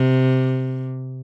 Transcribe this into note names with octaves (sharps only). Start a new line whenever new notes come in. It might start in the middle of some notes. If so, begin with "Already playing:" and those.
Already playing: C3